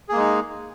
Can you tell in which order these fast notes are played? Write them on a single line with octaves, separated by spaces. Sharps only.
G#4 A#3 G#3 D#4